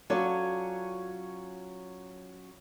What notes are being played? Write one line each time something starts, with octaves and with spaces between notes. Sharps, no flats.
F#3 C#4 F4 A4 D5